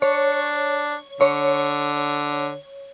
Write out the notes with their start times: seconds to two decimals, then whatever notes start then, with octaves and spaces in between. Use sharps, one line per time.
0.02 D4 C#5
1.21 D3 C#5